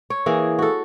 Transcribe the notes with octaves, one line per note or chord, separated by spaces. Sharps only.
C#5
E3 A#3 G#4
F#4 A4